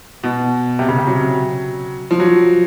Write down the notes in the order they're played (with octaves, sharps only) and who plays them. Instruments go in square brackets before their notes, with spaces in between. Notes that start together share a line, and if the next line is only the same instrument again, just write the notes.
[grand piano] B2
C3
C#3
C3
F#3
F3
F#3